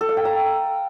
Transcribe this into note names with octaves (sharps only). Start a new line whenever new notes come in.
A4
F5
G5
A#5